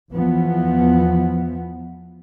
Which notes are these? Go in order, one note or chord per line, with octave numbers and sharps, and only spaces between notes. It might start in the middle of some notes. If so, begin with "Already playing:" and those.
E2 E3 F3 B3